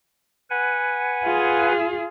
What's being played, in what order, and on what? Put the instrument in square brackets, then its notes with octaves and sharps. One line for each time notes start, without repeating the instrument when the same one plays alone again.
[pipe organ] B4 F#5 G#5
[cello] F4 G#4